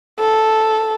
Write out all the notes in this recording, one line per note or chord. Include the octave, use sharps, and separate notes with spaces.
A4